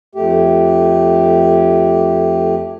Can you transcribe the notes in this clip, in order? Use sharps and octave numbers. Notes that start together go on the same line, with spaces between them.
F2 A3 G4